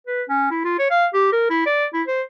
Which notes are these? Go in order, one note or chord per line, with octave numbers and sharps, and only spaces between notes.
B4
C#4
E4
F4
C#5
F5
G4
A#4
E4
D5
E4
C5